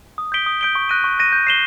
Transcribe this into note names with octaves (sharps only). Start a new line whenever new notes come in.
D#6
G6 B6 D7 G7
D#6
G6 B6 D7 G7
C#6
F#6 A#6 D#7
C#6
F#6 A#6 D#7
G6
C7 E7 G7